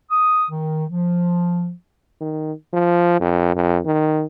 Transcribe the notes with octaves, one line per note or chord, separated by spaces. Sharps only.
D#6
D#3
F3
D#3
F3
F2
F2
D#3